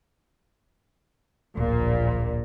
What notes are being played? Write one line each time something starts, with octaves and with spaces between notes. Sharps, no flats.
D1 A#1 A#2